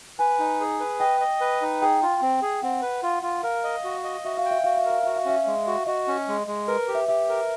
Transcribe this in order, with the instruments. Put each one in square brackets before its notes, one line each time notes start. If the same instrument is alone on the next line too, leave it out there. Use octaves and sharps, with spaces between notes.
[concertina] B4 [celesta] G#5
[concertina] D#4
G#4
B4
[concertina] D#5 [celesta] G5
[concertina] D#5
B4
D#4
[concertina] G#4 [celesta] G5
[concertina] F4
C4
G#4
[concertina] C4 [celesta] F#5
[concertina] B4
F4
F4
[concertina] A#4 [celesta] F5
[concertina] D#5
F#4
D#5
[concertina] F#4 [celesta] E5
[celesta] F5
[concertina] G5
[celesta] E5
[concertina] F#4 [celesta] F5
[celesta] E5
[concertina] A#4 [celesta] F5
[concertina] F#4 [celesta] E5
[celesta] F5
[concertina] C#4 [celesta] E5
[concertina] G#3
F#4
[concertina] F#4 [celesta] D#5
[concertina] C#4
G#3
G#3
[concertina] A#4 [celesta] B4
[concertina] G4
[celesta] E5
[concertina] G4 [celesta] E5
[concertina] A#4